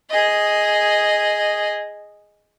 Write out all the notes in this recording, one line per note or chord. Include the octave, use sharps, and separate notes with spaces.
G#4 D#5